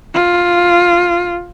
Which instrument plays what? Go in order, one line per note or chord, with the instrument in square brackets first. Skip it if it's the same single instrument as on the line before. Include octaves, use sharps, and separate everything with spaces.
[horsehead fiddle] F4